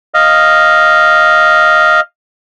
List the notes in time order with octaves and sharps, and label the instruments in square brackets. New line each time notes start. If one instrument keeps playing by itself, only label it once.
[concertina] D#5 F5